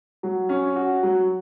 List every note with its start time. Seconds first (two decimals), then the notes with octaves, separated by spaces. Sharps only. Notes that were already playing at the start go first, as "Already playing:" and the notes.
0.23 F#3
0.49 C#4
0.76 F#4
1.03 F#3